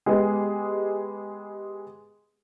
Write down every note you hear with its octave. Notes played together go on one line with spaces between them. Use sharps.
G#3 B3 G4 G#4